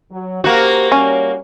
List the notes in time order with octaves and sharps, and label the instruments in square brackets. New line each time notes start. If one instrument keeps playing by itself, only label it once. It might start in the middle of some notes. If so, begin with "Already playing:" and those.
[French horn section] F#3
[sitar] A#3 F#4 [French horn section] G4 C5
[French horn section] G3 C#5 [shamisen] C#4